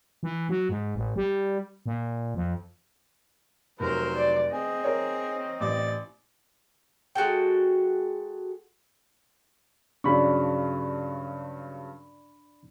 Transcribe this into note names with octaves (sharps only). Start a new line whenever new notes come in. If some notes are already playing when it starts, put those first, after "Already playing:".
E3
F#3
G#2
A1
G3
A#2
F2
F1 F#3 A#4 C5
D5
C4 G#4 D#5
A#4 C#5
A1 D5
G#3 F#4 A4 G5
G2 C#3 F#3 D4 B5 C#6